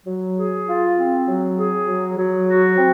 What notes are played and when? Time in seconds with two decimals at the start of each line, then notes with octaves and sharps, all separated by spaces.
0.06 F#3
0.36 G#4
0.66 F4
0.97 C4
1.26 F#3
1.57 G#4
1.87 F#3
2.17 F#3
2.48 F#4
2.77 C4